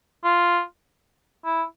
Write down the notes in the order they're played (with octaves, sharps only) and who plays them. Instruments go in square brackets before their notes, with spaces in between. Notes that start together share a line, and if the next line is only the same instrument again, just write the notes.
[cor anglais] F4
E4